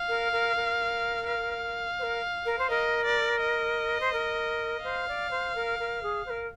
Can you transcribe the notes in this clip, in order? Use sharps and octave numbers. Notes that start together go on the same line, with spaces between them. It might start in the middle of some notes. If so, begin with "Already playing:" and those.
Already playing: F5
A#4
A#4
A#4
F5
C5
A#4
A#4
C5
A#4 D#5
D5
D#5
C5
A#4
C5 F5
D5
C5
A#4
A#4
G#4
C5
A#4